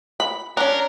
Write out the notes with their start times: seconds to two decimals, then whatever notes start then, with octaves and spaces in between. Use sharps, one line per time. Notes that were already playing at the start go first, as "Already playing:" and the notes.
0.20 B5
0.57 C#4 D4 A#4